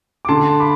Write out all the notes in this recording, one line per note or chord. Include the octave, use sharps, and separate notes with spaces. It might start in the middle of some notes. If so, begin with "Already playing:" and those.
D6
D3 A5 C6
B5 D6